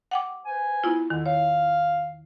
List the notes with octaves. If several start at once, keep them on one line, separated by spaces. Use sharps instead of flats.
F#5 G5 D6
B4 C5 G#5
B3 E4 F4
E2 D3 D#3
C#5 F5